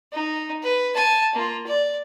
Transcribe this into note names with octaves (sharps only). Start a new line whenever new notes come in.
D#4
B4
G#5 A5
A#3 F4
D5